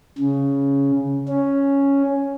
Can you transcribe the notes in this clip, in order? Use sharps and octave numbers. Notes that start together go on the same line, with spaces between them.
C#3
C#4